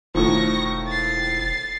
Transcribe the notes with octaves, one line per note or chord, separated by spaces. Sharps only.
E1 A2 D#3 F3 C#6 A#6
A6 C7